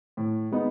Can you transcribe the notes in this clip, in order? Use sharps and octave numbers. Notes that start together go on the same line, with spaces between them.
A2
G#3 B3 D#4